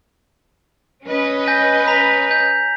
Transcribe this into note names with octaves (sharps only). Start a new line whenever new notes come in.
C#4 B4 D#5
G#5 G6 A#6
A#5 B6 F7
G6